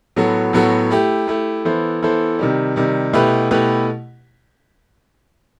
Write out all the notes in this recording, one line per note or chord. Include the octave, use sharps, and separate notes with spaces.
A2 F#3 B3 F#4 A4
A2 F#3 B3 F#4 A4
A3 E4 G4
A3 E4 G4
E3 B3 E4 A4 C5
E3 B3 E4 A4 C5
C3 D#3 G3
C3 D#3 G3
B2 A3 E4 G4 B4
B2 A3 E4 G4 B4